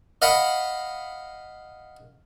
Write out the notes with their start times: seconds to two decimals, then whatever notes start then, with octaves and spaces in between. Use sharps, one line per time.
0.22 D#5 F5 F#5 B5